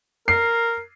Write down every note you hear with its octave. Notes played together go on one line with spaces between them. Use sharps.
A#4 C7